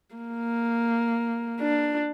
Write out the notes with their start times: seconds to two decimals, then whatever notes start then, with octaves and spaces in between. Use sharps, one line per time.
0.16 A#3
1.60 D4